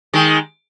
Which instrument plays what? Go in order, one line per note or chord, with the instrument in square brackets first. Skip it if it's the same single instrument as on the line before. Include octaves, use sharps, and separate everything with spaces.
[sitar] D#3 G#3